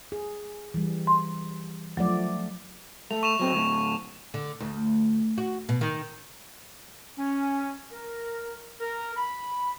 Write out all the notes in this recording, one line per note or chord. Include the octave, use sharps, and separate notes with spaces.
G#4
E3 G3
C6
F3 F#3 A3 D5
A3 F7
C#6 E7 F7
F#3 C4
D2 A2
D3
D2
F#4
B2
D#3
C#4
A#4
A#4
B5